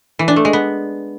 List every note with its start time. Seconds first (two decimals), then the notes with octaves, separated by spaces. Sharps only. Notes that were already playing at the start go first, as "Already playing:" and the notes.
0.19 E3
0.28 D4
0.36 A3
0.45 G#3
0.53 B3